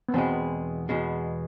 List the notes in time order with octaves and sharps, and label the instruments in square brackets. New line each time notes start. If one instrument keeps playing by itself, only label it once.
[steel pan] B3
[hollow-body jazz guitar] E2 B2 G#3 [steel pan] C4
[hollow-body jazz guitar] E2 B2 G#3